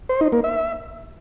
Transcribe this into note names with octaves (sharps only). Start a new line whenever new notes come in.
C5
D#4
A#3
E5